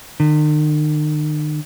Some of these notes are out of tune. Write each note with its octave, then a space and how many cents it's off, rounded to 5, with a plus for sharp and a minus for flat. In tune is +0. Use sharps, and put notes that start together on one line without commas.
D#3 -45